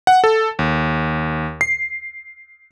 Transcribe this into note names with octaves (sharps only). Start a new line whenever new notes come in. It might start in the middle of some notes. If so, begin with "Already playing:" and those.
F#5
A4
D#2
C7